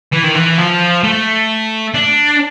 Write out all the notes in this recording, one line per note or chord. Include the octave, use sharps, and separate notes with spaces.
E3
D#3
E3
F3
A3
D4